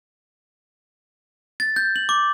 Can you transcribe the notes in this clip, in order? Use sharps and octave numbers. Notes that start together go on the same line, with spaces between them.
A6
G6
F#7
D6